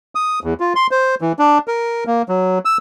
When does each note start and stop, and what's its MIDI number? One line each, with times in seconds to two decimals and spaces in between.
0.15 0.39 87
0.44 0.54 40
0.60 0.73 65
0.76 0.87 84
0.91 1.15 72
1.21 1.33 52
1.39 1.58 62
1.68 2.04 70
2.07 2.22 58
2.29 2.59 54
2.65 2.78 88